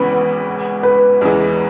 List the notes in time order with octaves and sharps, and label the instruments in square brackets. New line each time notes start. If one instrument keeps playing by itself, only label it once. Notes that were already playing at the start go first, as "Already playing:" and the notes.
Already playing: [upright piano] G#1 F#2 C#3 E3 B3 [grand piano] B4
[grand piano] B4
[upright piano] E2 C#3 E3 G#3